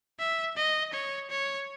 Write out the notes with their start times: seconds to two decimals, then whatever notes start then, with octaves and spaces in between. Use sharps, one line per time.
0.19 E5
0.57 D#5
0.93 C#5
1.30 C#5